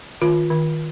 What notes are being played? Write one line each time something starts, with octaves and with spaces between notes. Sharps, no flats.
D#3 F4
D#3